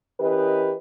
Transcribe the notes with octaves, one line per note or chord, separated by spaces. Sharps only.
E3 C#4 G4 A#4 B4 D#5